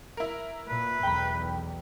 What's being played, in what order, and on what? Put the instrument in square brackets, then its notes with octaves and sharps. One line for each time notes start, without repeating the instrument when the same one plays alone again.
[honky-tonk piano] E4 A#4
[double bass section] A#2 [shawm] B4
[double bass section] B1 E2 [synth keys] G5 A#5 B5